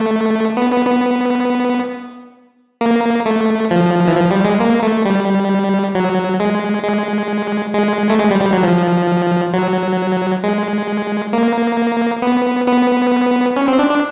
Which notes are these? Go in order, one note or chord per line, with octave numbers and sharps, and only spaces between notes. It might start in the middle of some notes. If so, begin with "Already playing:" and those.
Already playing: A3
B3
B3
B3
A#3
A3
F3
E3
F3
G3
G#3
A#3
A3
G3
F#3
G#3
G#3
G#3
A3
G#3
G3
G3
F#3
F3
F#3
G#3
A#3
B3
B3
C#4
C4
D4
D4